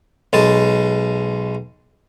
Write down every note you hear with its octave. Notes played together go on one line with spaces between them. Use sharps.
B1 G#3 A5